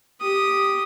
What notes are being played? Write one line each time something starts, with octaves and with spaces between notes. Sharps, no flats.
G4 D#6